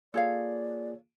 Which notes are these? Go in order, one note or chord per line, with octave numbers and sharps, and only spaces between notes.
A#3 F4 G#4 A4 C#5 D5 F5